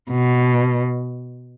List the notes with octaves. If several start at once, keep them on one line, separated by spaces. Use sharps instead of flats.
B2